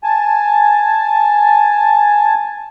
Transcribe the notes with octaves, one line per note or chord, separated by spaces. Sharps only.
G#5 A5